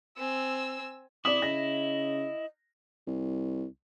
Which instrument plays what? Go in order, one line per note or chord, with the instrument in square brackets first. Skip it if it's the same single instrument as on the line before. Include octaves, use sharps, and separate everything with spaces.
[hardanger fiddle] C4 G#5 [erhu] E6
[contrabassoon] C3 [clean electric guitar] E4 E5 [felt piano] D5 D#6 [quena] D6
[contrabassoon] C#3 [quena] D#5 [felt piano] A#6
[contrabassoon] C2